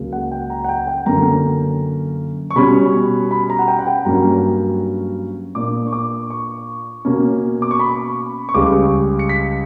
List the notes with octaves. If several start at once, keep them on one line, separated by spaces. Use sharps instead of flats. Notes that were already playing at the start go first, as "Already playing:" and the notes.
Already playing: C#2 C#3 F#3 A#3
F#5
G5
A#5
F#5
G5
G5
F#2 D3 A#3 C#4 A#5
C#6
B2 G3 C#4 B5
B5
A#5
F#5
G5
F#5
G5
G2 F#3 A#3 C#4 A#5
A#2 A#3 D4 D6
C#6
D6
C#6
B2 A#3 C#4
D6
C#6
B5
C#6
C#2 C#3 G3 D6
C#7
B6